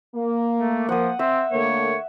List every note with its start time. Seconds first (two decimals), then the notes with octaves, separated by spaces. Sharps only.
0.16 A#3
0.55 A3
0.89 F3 F#5 D#6
1.19 C4 E5
1.52 D3 A3 A#3 C#5